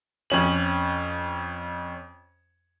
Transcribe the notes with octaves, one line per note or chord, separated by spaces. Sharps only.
F2 C#4 F#7